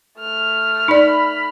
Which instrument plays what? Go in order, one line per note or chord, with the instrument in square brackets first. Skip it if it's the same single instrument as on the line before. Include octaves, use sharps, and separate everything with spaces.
[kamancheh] A3 F6
[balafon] D#4 D5 [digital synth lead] B5